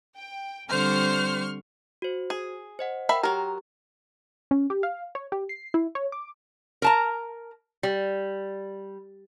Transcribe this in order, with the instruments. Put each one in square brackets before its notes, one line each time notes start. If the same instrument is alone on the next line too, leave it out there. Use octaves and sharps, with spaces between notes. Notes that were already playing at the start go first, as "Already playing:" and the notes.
[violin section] G5
[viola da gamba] D3 C4 [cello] G3 [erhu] C5 [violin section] C6 C#6 F6
[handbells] F#4 C5
[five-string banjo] G#4
[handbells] C5 D#5 F#5
[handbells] A#4 G5 [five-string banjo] E5 B5
[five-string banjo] F#3 A#4 [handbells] G4
[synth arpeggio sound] C#4
G4
F5
C#5
G4
C7
E4
C#5
D6
[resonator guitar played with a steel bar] A#4 A5 A#5
G3